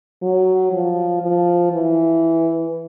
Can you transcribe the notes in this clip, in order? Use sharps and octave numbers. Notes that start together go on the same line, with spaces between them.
F#3
F3
F3
E3